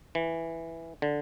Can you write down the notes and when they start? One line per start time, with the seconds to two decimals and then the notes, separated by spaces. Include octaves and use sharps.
0.15 E3
1.02 D3